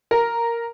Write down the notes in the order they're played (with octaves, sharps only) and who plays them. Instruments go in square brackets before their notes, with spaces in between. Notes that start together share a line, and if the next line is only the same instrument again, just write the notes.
[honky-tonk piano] A#4